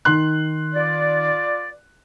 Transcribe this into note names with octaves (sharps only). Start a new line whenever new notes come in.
D#3 C6 F#6
F4 B4 D5